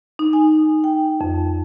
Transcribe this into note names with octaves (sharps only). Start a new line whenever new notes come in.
D#4
G#5
G5
F2